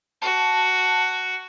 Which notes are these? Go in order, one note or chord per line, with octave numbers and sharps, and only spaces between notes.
F#4 A5